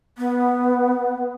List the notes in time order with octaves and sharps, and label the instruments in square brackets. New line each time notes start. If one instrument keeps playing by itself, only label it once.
[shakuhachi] B3